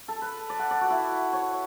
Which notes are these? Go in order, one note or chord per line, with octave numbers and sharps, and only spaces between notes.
A4
B4
D5
F#5
D5
F#4
E4
C#5